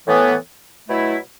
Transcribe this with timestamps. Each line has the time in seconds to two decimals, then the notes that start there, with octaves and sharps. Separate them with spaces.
0.06 A2 E3 B3
0.88 B2 F#3 A3 E4